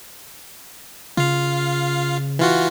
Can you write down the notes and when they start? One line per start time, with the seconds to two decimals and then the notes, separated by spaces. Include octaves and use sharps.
1.17 C#3 F4 F5
2.39 E3 F4 F#4